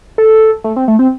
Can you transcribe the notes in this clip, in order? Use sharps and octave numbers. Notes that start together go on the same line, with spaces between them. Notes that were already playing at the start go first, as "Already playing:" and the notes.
A4
A3
C4
A3
C4